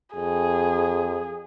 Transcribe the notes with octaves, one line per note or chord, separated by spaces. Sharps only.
F2 G#4